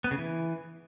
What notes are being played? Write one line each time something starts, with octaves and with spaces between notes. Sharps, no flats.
B3
C#3
E3